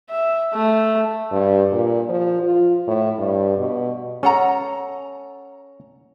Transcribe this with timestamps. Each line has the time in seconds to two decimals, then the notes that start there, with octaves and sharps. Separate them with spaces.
0.10 E5
0.54 A3
1.31 G2
1.72 A#2
2.09 F3
2.43 F4
2.87 A2
3.18 G2
3.58 B2
4.23 C#4 A4 F#5 A#5